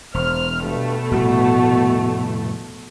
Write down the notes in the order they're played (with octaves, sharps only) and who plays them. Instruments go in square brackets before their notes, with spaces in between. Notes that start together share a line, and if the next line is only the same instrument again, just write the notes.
[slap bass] E1 [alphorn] C5 [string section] F6
[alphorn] G2 [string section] B2 A3
[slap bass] F1 A2 G3 [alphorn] F#4